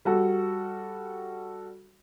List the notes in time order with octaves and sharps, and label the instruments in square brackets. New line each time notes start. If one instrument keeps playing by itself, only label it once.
[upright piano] G3 F#4 A4